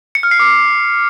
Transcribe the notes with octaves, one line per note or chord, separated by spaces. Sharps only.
C#7
F6
C7
D6